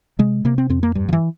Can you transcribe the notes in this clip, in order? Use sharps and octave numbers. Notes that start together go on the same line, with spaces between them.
C3 G#3
C3 A#3
C4
F2 C4
A#3
G2 G3
F3
E3